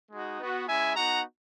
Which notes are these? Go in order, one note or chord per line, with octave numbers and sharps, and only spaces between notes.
G#3 D#4 F#4
B3 F#4
G#3 C#4 E4 E5 G#5
B3 D#4 F#4 F#5 A#5